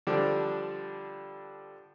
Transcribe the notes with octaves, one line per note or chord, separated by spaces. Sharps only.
D3 F3 G3 D4